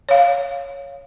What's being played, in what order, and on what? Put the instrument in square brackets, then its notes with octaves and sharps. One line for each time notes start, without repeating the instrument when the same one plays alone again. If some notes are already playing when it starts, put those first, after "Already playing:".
[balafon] C#5 F5